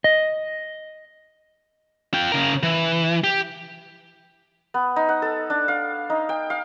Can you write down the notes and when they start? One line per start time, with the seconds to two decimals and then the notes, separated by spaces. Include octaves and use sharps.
0.04 D#5
2.14 F4 G5
2.32 C#3 A#4
2.63 E3
3.24 G4
4.74 B3
4.96 D#4
5.09 F#5
5.22 A4
5.50 D4
5.68 F5
6.10 D#4
6.29 G5
6.50 F5